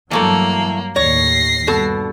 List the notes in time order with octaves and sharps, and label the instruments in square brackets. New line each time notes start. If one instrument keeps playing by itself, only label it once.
[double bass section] G2 F#3 [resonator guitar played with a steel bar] E3 A3 A4 [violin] A#3
[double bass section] D#2 A2 D#3 [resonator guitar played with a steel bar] C#5 [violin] A#6 C7
[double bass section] G2 [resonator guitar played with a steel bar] B2 A4